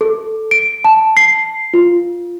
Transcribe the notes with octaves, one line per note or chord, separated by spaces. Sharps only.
A4
D7
A5
C7
F4